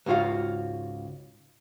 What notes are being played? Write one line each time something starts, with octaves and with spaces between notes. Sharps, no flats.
C#2 G#2 F4 F#4 F5